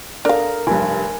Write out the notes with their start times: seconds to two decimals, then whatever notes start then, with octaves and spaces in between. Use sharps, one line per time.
0.25 D4 A4 A#4 F5
0.67 F1 G2 G#5